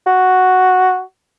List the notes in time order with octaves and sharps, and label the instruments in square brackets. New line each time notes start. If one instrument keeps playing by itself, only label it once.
[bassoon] F#4